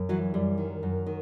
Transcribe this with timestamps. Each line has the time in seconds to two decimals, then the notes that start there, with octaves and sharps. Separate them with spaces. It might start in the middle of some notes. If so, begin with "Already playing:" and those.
Already playing: F#2
0.09 E3 F#3
0.34 F#2 G3
0.58 D#3
0.83 F#2
1.07 D#3